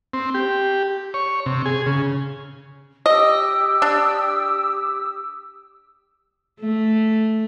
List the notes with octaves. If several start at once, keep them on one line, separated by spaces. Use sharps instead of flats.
C4
G4
C#5
C3
G#4
C#3
G4 D#5 D#6 E6
D4
A3